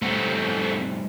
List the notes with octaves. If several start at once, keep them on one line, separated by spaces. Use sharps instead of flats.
A2 G3 A3 C4 F#5